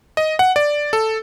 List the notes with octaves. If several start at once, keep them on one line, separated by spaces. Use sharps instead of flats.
D#5
F#5
D5
A4